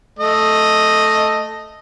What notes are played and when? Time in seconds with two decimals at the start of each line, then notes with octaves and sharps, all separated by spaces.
0.19 A3 D#5